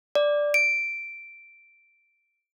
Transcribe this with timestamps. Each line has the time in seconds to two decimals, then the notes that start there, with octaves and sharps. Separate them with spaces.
0.15 D5
0.54 D7